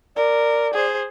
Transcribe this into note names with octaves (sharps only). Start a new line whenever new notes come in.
A#4 D5
G#4 C5